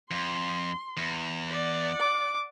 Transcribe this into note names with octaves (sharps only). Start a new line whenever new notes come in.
F2 C6
E2
D5 F#5
D6